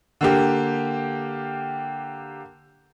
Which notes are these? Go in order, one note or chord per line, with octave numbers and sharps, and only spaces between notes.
D3 A#3 G4